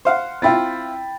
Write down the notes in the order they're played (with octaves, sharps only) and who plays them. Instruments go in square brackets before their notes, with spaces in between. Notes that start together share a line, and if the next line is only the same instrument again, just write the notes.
[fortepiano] C5 F5 F#5
[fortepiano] C4 E4 F4 [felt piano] G5 B5 A6